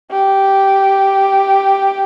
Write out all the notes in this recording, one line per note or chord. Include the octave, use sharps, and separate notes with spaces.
G4